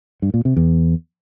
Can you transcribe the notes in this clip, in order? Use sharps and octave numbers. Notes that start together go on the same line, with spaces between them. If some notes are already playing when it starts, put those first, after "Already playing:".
G2
A#2
C3
E2